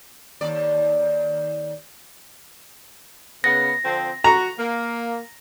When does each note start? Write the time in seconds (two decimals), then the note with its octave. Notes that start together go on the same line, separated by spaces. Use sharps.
0.41 D#2 D5
3.44 C#3 B3 A#6
3.84 D3 F3 C4
4.24 F#4 A#5
4.58 A#3